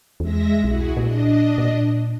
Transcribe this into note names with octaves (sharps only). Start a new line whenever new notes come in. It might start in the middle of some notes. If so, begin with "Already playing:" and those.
E2 G#3 E5 A#6
B1 E4 F#4 G#4
A#2 D4 D#5
A#2